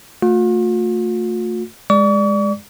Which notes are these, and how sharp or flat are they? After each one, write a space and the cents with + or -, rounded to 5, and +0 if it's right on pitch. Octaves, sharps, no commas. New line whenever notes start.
A3 +20 F4 +45
G#3 -10 D5 +0 C#6 +45